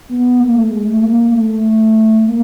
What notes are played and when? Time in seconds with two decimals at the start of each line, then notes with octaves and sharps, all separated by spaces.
0.09 B3
0.40 A#3
0.55 A3
0.71 G#3
0.86 A3
1.03 A#3
1.34 A3
2.27 A#3